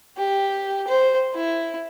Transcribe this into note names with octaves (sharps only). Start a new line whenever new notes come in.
G4
C5
E4